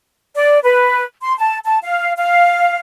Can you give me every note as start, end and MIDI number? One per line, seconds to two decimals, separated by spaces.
0.36 0.59 74
0.63 1.03 71
1.20 1.33 84
1.38 1.57 81
1.65 1.78 81
1.83 2.12 77
2.17 2.78 77